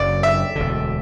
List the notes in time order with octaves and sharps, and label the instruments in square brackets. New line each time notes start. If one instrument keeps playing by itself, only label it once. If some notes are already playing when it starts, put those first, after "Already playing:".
Already playing: [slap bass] F#1 F#2 C#3 F#3 [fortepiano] D5
[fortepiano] E5
[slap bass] E1 D2 D3